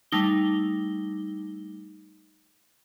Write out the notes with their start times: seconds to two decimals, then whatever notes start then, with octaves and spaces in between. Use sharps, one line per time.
0.12 G3 A3 D#4 G7